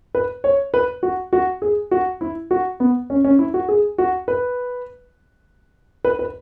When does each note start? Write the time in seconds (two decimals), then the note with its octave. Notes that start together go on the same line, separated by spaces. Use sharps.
0.15 B4
0.44 C#5
0.74 B4
1.03 F#4
1.33 F#4
1.62 G#4
1.91 F#4
2.21 E4
2.51 F#4
2.80 B3
3.10 C#4
3.25 C#4
3.39 E4
3.54 F#4
3.69 G#4
3.98 F#4
4.28 B4
6.05 B4
6.19 B4